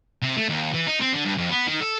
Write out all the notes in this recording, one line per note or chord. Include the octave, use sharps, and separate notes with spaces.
C3
A3
D#2
E3
D#4
C4
D3
G2
F2
B3
D#3
A4